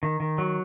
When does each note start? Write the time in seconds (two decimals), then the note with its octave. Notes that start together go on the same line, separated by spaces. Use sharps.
0.03 D#3
0.20 D#3
0.38 F#3